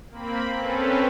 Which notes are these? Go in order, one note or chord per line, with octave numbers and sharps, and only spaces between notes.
A#3 C4 B5
C4 C#4 A4 B4